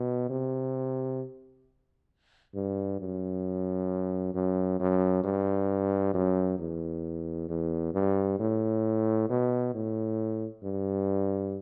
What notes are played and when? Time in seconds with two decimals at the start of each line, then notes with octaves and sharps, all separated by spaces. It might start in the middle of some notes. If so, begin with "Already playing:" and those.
Already playing: B2
0.30 C3
2.55 G2
3.00 F#2
4.35 F#2
4.80 F#2
5.24 G2
6.14 F#2
6.59 E2
7.49 E2
7.94 G2
8.39 A2
9.29 B2
9.74 A2
10.64 G2